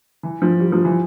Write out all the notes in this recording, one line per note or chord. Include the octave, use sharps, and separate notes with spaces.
E3
F3
G3
F3
E3